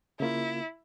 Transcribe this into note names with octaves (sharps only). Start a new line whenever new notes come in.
C#3 A#3 E4 F4